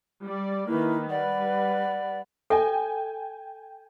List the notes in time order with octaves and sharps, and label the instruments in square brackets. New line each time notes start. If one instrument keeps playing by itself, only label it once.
[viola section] G3 D5
[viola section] D#3 A#3 B4 [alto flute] E4
[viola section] G3 B4 [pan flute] D5 [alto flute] F#5
[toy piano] A4 E5 [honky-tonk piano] G5 G#5